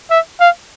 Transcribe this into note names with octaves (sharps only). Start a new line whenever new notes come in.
E5
F5